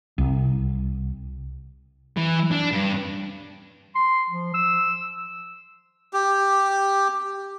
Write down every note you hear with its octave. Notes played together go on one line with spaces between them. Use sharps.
C2
E3
D4
G2
C6
F3
E6
G4